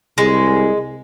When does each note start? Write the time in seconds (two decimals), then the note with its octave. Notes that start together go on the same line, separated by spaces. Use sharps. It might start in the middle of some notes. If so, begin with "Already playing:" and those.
0.18 C2 G#3